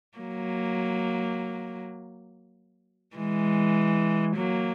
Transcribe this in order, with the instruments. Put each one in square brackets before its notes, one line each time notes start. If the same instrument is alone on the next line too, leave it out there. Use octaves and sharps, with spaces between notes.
[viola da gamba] F#3 A#3
E3 G#3
F#3 A#3